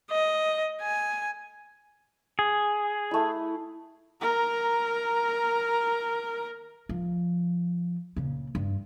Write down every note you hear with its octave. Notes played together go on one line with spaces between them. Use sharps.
D#5
G#5
G#4
A3 E4
A#4 A#5
F3
A#2 C#3
G2